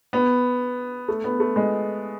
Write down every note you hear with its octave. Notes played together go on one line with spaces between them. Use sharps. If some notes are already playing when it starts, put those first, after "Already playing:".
B3
A3
B3
A3
G#3